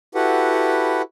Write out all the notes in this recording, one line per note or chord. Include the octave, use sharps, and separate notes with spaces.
E4 F#4 G4 A4 B4 F#5